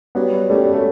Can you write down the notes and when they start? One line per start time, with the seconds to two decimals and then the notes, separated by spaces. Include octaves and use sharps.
0.15 F#3 G3 B3
0.50 G3 A3 C#4
0.73 F#3 A3